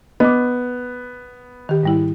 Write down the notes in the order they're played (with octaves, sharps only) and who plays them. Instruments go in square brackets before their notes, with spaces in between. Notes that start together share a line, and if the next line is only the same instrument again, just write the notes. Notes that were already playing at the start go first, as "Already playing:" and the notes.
[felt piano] B3 [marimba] D#5 D6
[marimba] D#3 G4
G#2 G3 E4